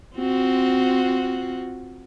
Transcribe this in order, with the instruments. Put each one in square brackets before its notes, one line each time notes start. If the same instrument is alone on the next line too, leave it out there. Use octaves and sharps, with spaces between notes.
[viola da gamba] C4 F4 F#4